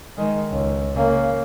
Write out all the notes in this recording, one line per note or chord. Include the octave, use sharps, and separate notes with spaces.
D#3 G#3
C#2
C#3 A#3